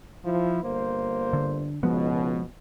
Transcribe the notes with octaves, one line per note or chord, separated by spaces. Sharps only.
F3 E4
G1 A#3 C5
D3
C#2 G#2 B2 F3 G#3 B3